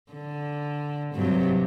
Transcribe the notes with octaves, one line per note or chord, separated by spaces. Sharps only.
D3
G2 C3 F#3